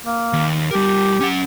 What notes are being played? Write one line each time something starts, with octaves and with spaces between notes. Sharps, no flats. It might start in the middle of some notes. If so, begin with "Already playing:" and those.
A#3
D#2
G3 G4 A#4
C#4 F#5